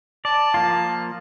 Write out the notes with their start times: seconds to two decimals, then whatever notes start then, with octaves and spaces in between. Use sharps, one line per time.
0.25 D5 A5
0.54 F3 A#3 F4